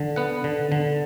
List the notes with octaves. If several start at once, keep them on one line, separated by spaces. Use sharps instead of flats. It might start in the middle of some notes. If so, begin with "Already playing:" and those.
Already playing: D3
B3 F#5
D3
D3